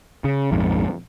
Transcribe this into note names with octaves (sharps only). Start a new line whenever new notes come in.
C#3
A#1 F2 G#2